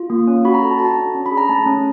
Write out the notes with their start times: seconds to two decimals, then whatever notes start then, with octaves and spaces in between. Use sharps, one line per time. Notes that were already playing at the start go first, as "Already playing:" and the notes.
Already playing: F4
0.10 A#3
0.28 C#4
0.45 F#4 B5
0.54 A#5
0.62 A4
0.71 A5
0.78 F#4 A#5
0.85 A5
0.97 D4
1.15 C#4
1.26 B5
1.31 G#4
1.38 A#5
1.49 A3 A5
1.66 C#4